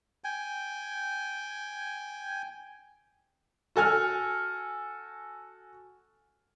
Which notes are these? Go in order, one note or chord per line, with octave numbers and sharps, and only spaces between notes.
G5 G#5
F#4 A4 G#5 F6